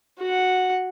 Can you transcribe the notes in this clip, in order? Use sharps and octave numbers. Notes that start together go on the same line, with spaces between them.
F#4 F#5